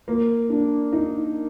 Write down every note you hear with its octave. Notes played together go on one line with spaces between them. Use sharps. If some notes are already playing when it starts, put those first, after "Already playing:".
A#3
D4
D#4